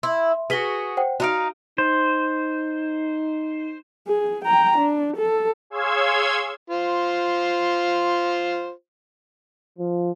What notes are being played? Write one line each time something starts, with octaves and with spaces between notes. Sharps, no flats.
E4 C6
F#4 G#4 B4 B6 G7
C5 F#5 G5
D4 D#4 F#4 F5 D7
D#4 C5
G#4
G5 A#5
D4
A4
G#4 C#5 F5 C6 E6 G#6
F4 C5
F3